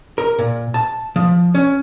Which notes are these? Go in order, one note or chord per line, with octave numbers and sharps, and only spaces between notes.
A#4
A#2
A5
F3
C#4